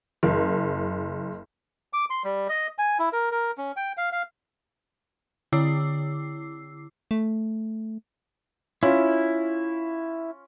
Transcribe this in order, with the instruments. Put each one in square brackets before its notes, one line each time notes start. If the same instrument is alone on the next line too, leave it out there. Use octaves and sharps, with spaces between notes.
[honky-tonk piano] F#1
[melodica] D6
C6
G3
D#5
G#5
E4
A#4
A#4
C#4
G5
F5
F5
[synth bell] D3 E4 D6 E6 C7
[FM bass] A3
[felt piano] C#4 F4 [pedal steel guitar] E4